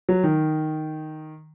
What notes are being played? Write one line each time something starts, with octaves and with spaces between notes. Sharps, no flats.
F#3
D#3